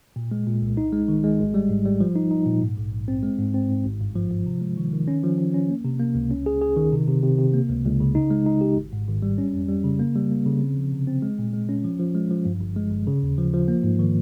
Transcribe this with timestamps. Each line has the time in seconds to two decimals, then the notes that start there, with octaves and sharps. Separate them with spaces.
0.16 A#2
0.31 G#3
0.47 A#2
0.62 C2
0.77 D#4
0.93 G#3
1.08 D#3
1.24 G#3
1.39 G#1
1.54 G3
1.69 G#2
1.85 G3
2.01 F3
2.16 D#4
2.31 D#4
2.46 A#2
2.62 G#2
2.77 A#1
2.92 A#1
3.08 C4
3.23 G#3
3.39 G#2
3.54 C4
3.69 G#2
3.84 G#1
4.01 G2
4.16 F3
4.31 F3
4.46 C3
4.61 G#3
4.77 D#3
4.93 D#3
5.08 C#4
5.23 F3
5.38 F3
5.54 C#4
5.69 A#3
5.84 C3
6.00 A#3
6.15 C#2
6.31 C#4
6.46 G#4
6.61 G#4
6.77 D#3
6.92 C3
7.07 C3
7.23 C3
7.38 C3
7.54 A#3
7.69 C#2
7.85 C#2
8.00 C#3
8.15 D#4
8.30 G#3
8.46 D#4
8.61 G4
8.77 G#1
8.93 G#2
9.07 G#1
9.22 G3
9.38 C#4
9.54 F2
9.68 G3
9.84 C#3
10.00 A#3
10.16 G3
10.31 A#3
10.46 C#3
10.61 C4
10.77 F3
10.92 C3
11.07 C4
11.22 G#3
11.39 A#2
11.53 G#3
11.69 C#4
11.85 F3
11.99 F3
12.15 G#3
12.30 F3
12.45 G2
12.61 G1
12.76 G#3
12.92 G1
13.07 C#3
13.23 D#2
13.38 F3
13.53 F3
13.68 A#3
13.83 G#2
13.99 D#3